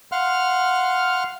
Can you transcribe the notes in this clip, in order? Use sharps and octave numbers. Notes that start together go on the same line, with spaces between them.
F5 F#5 C6 F6